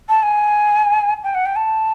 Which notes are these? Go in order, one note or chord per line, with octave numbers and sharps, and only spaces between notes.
A5
G#5
G5
F#5
G5
A5